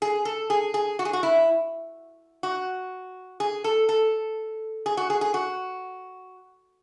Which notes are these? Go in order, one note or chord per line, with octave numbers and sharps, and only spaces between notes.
G#4
A4
G#4
G#4
F#4
G#4
F#4
E4
F#4
G#4
A4
A4
G#4
F#4
G#4
G#4
F#4